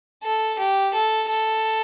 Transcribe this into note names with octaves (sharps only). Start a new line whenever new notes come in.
A4
G4
A4
A4